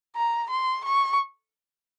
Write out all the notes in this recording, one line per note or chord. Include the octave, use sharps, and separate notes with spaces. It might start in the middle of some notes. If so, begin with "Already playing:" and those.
A#5
C6
C#6